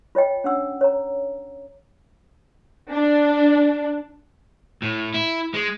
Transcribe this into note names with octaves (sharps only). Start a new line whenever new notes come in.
F4 C#5 D#5 G5
C#4 D4 F#5 E6
C#5 A#5
D4
A2
E4
G#3